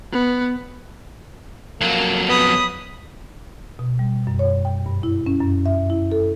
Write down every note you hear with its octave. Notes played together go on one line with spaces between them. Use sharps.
B3
F2 F#3 A#3
B3 B5 D#6
B2
G3
F#2
C#5
G5
G2
E4
C#4
F#2
E5
E4
A4